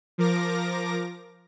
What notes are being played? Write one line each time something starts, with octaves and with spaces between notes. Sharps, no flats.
F3 A#4 D6 A#6